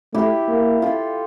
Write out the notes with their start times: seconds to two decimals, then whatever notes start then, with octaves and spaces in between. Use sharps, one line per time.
0.14 A3 E4 G4
0.48 A#3
0.82 F4 A4